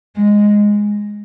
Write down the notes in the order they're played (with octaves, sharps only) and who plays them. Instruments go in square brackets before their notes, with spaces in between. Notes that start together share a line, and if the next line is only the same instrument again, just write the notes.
[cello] G#3